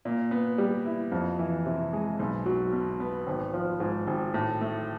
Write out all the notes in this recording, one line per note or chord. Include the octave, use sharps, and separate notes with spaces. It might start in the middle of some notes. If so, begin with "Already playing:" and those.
A#2
B3
G3
E4
F2
E3
C3
G#3
B1
F#3
B2
B3
G#1
F3
G#2
G#1
A2
A3